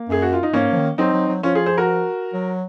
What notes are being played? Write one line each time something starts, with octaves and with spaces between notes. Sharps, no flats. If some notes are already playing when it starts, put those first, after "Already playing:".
Already playing: A#3
F#2 G#4
F#4
F4
D#4
G#2 A#3 C#4
F3
D#3
F#3 C4 D#4
F#3
F#3
F3 C#4 F4
F4 G#4
G#4 C5
F#4 A#4
F#3